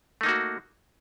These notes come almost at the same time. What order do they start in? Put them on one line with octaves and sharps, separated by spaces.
A3 D#4 A#3 F#4